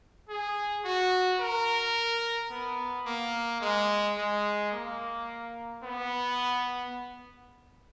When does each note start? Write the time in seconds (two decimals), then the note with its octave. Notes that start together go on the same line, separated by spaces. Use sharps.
0.29 G#4
0.85 F#4
1.40 A#4
2.51 B3
3.06 A#3
3.61 G#3
4.17 G#3
4.72 A#3
5.83 B3